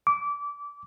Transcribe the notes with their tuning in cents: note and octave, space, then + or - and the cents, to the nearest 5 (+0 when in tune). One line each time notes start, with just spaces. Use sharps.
D6 -25